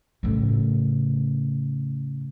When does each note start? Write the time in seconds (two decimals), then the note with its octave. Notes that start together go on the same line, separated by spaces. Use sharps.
0.23 A2 C#3